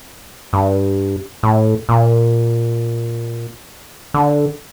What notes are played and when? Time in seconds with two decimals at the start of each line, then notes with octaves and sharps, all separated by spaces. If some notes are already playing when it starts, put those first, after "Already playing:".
0.53 G2
1.43 A2
1.89 A#2
4.14 D3